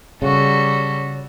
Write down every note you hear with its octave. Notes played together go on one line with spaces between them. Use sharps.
C#3 G3 F#4 A4